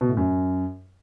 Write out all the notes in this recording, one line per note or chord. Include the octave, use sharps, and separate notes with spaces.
B2
A2
F#2